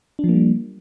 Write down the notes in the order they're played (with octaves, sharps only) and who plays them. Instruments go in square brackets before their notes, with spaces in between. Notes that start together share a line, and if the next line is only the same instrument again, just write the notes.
[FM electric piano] D4
F3
A#3
G3